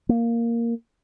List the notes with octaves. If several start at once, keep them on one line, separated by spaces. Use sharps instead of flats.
A#3